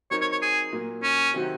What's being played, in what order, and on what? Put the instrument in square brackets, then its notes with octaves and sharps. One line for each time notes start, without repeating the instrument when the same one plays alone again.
[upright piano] F#3 C4 D#4 A#4 [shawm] C#5
[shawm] C#5
C#5
G#4
[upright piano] A#2 F#3 A#3
[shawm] C#4
[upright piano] C3 D#3 F#3 C4 F#4